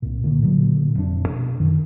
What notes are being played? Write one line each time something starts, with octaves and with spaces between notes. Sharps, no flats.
C2 A#2
A#2 D3 E3 A#3
A#2 D3 F#3
F1 D4
B2
F#2 D#3